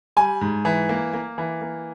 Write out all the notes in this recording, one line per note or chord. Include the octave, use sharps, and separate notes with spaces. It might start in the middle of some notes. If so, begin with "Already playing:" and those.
G3 G#5
G#2
E3
A#3
A#3
E3
A#3